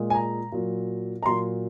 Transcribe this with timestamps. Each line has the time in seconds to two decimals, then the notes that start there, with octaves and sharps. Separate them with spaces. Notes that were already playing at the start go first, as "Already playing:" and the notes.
Already playing: A#2 G#3
0.10 G#5
0.14 A#5
0.52 A#2 F#3
1.23 A#5
1.26 A#2 F#3 C6